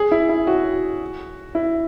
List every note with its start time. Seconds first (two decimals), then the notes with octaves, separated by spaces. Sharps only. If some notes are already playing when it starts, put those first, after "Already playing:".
Already playing: G#4
0.12 E4
0.29 E4
0.47 F#4
1.55 E4